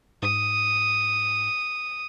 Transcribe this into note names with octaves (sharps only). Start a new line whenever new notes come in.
G#2 D#6